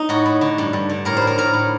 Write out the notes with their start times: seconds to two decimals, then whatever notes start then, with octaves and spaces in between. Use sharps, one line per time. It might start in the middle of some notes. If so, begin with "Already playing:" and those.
Already playing: D#4
0.09 A2 F#4
0.26 A2
0.41 D3
0.58 G2
0.73 G2
0.89 D3
1.05 A2 A#4
1.17 C5
1.22 A2
1.27 A#4
1.38 A2 A#4
1.54 A2